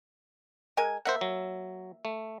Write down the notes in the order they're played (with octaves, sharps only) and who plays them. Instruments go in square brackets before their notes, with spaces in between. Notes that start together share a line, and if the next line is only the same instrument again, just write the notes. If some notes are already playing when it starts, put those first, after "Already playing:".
[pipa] G#3 A#4 G#5
[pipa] A#3 E5 [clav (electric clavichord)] C5 F#5
[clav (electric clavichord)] F#3
A3